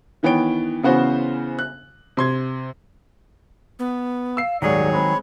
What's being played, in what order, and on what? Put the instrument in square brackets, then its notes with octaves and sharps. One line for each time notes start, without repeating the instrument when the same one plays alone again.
[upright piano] D#3 E3 B3 C#5 G5 D7
C#3 E3 B3 C#4 F#4 C5
F#6
C3 C6 G#6
[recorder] B3
[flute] F5 [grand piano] E6 C7
[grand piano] D#1 G#2 F#5 [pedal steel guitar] D#3 F#3 G#4 [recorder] C#5 [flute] D5
[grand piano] G#3 C4 [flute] B5